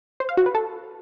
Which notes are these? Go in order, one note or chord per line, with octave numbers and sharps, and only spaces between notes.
C5
F5
F#4
B4
A4